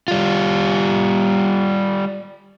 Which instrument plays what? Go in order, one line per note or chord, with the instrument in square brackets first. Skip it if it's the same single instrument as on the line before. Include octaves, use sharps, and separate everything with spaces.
[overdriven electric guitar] G3 F4